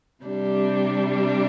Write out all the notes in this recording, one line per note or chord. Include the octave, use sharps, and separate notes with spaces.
C3 G3 D4